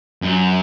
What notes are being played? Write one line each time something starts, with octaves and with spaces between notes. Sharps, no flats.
F#2